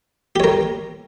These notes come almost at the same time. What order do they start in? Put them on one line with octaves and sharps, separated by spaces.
G4 C#5 A#4